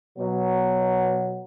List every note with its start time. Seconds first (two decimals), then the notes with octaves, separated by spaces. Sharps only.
0.18 B2 F#3